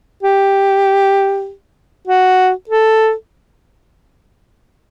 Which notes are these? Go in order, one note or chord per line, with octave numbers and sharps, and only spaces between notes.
G4
F#4
A4